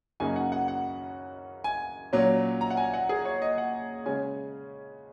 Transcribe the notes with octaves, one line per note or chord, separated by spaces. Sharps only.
F#2 C#3 A#3 D#4 G#5
F#5
F#5
F#5
G#5
A#2 F#3 C#4
A#5
F#5
G#5
F#5
G#4
C#5
D#5
F#5
C#3 G#3 C#4 G#5